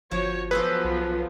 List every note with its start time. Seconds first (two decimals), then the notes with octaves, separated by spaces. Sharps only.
0.11 G1 F3 F#4 C#5
0.51 F3 F#3 B3 G#4 A4 B4 C5
0.84 B1